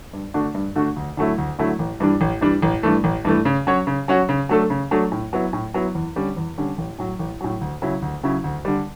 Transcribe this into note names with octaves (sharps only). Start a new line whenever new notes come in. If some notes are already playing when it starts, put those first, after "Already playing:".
G2
D3 A3 D4 F#4
G2
D3 A3 D4 F#4
D2
D3 F#3 A3 E4
D2
D3 F#3 A3 E4
A1
G2 E3 G3 D4
A1
G2 E3 G3 D4
A1
G2 E3 A3
A1
G2 E3 A3
C#3
F#3 C#4 F#4 C#5
C#3
F#3 C#4 F#4 C#5
C#3
F#3 A3 D4 A4
C#3
F#3 A3 D4 A4
A2
F#3 B3 E4
A2
F#3 B3 E4
E2
D3 G3 C#4
E2
D3 G3 C#4
A1
A2 F#3
A1
A2 F#3
D2
C#3 F#3 C#4 E4
D2
C#3 F#3 C#4 E4
D2
D3 G3